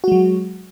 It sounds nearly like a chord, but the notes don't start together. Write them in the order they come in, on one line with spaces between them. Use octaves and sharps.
F#4 G#3 F#3